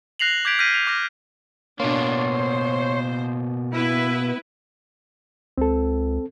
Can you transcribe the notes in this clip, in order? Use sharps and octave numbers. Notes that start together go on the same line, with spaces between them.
F#6 A#6 C7 F7 F#7
D6 G6 G#6 B6 D7 F7
F6 G6 A#6 B6 D#7
F7
D6 F6 A#6
B2 A#3 D4 C#5 C6
C5
B3 E4 B4
C#2 C4 A4